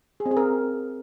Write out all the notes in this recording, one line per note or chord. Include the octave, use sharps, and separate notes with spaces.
G#4
C4
G#4
A#4